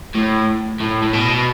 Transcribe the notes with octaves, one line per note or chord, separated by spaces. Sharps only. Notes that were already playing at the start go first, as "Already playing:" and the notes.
A2
A2
A2
B2